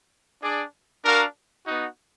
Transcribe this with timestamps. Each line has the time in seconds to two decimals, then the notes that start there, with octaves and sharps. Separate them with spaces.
0.40 D4 G#4 D5
1.02 D4 F#4 A#4 F5
1.64 B3 D#4 F#4